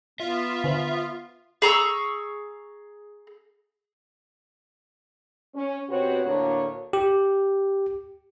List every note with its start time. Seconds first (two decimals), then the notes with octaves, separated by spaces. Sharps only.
0.20 B3 F4 E5
0.64 D3 B4 C5
1.62 G#4 A#5 C#6 E6
5.55 C#4
5.89 B2 C4 F#4 G4 B4 C#5
6.25 D2 A2 A#3 D4 A#4 C#5
6.93 G4